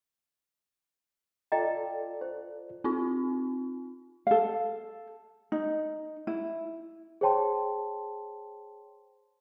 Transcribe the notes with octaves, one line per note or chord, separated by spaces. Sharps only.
F4 A4 D5 D#5 G5 A#5
C5
C4 D#4 F4
A4 F5
D#4
E4
G#4 C5 C#5 G5 A5 C6